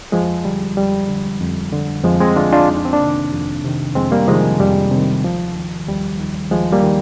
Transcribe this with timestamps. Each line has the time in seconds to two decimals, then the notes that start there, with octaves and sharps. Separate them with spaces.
0.12 F2 F3 G#3
0.45 D3 G3
0.77 F2 G3
1.08 D3
1.40 F2
1.72 D3
2.04 F2 F3 G#3
2.20 G#3 C4
2.36 D3 D4 F4
2.53 D4 F4
2.68 F2 D#4
2.77 D4
2.85 C4
2.93 A#3 D4
3.00 C3 D#3
3.32 F2
3.65 C3 D#3
3.95 F2 G#3 C4
4.12 G3 A#3
4.28 C3 D#3 F3 G#3
4.59 F2 G3
4.91 C3
4.97 D#3
5.23 D#2 F3
5.56 D#3
5.88 D#2 G3
6.20 D#3
6.51 D#2 F3 G#3
6.72 G3 A#3
6.83 D#3